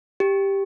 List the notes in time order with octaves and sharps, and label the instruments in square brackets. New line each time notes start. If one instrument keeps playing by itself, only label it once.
[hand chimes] G4